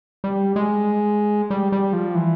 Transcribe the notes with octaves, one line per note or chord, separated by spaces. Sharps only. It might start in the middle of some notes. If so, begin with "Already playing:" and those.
G3
G#3
G3
G3
F3
E3